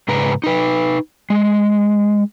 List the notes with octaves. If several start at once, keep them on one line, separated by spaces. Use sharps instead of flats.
G#2 C#3 B4 A#5
D#4 B4
G#3